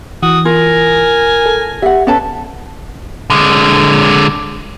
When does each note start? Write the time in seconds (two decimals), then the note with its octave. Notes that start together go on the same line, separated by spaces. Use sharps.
0.23 E3 F#4 D#6
0.45 F4 A#4 G#5
1.46 A4
1.82 G4 E5 F#5
2.07 C#4 A4 B4 A5
3.30 D3 G#3